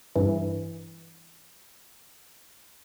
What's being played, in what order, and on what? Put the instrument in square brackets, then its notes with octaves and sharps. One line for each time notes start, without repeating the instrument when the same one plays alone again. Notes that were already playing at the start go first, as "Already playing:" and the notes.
[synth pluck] G2 E3